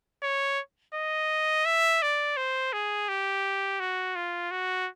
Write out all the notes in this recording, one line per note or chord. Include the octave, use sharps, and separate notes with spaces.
C#5
D#5
E5
D5
C5
G#4
G4
F#4
F4
F#4